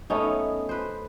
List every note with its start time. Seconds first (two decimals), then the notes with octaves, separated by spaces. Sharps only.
0.10 A3 B3 C#4 D#4
0.69 B4 C5